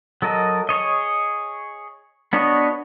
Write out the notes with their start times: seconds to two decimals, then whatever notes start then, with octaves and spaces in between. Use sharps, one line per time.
0.22 F#3 A4 A#4 D#5
0.69 G#4 C#5 D#5
2.33 B3 D4 F#4 C#5 D#5